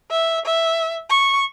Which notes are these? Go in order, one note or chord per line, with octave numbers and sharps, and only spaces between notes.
E5
E5
C#6